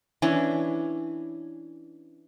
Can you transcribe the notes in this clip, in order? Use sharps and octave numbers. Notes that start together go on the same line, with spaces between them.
E3 C#4 D4 E4